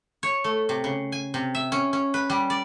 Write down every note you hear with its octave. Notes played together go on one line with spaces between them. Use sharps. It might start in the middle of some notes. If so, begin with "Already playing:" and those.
C#5
A3
C3
C#3
G#5
C3
E5
C#4
C#4
B4
G3
D5